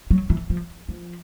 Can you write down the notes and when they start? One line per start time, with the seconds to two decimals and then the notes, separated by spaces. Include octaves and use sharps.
0.10 F#3
0.30 E3
0.50 F3
0.89 F3